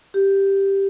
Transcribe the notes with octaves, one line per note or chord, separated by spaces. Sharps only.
G4